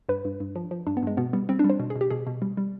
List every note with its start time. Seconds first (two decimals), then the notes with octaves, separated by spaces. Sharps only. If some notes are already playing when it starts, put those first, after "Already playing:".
0.09 G2 B4
0.25 G2
0.40 G2
0.56 F3
0.71 F3
0.87 G2 D4
0.97 B3
1.03 G2 G#3
1.17 B2 B3
1.33 G3 B3
1.49 G3 C4
1.59 D4
1.64 G3
1.70 C5
1.80 B2
1.90 G#4
1.96 B2
2.01 G4
2.10 B2 G#4
2.27 B2
2.42 G3
2.57 G3